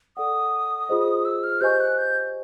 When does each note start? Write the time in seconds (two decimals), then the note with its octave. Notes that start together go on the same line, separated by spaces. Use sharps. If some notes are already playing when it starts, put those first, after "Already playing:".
0.17 A4 D5 F#5 D#6
0.89 F4 G#4 C5 D#5
1.25 E6
1.43 F6
1.61 G4 C5 D#5 G#5 C#6 G6
1.80 F#6
1.98 G6